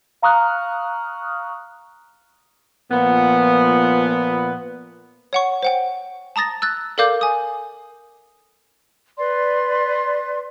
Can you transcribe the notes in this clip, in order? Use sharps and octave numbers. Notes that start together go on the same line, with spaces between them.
F5 A#5 C#6 D#6 F6 F#6
A#2 F3 B3
C#5 F#5 C#6
C5 F#5 G5
A5 A#5 D#6 A6 A#6
E6 F#6 A6
A4 A#4 D5 F5 D6 G6
G#5 D#6
B4 D5 C6